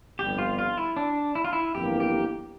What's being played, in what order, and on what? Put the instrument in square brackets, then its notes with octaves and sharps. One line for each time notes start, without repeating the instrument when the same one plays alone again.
[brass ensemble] G1 F2 D3 G3 [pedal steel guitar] G4
[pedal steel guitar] F4
F4
E4
D4
E4
F4
E4
[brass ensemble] G1 F2 E3 G3 A#3 [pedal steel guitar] G4
[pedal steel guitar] G4